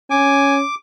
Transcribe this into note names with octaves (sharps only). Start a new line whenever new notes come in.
C#4 G#5 D6